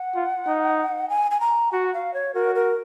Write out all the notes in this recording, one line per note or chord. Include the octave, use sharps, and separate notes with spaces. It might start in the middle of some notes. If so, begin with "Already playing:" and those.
Already playing: F#5
F4
D#4
G#5
G#5
A#5
F#4 F#5
F5
C#5
F#4 A#4
A#4